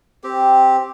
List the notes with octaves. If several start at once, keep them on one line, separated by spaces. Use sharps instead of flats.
C4 G4